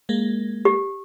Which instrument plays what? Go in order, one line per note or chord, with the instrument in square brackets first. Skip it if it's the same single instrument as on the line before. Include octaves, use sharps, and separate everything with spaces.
[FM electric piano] G#3 A#3
[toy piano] G4